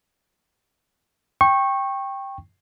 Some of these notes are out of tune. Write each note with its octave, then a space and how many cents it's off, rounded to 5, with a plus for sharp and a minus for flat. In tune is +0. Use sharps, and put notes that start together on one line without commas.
G5 +5 C#6 -20